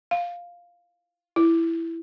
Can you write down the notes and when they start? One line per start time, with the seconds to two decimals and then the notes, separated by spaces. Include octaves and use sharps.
0.11 F5
1.36 E4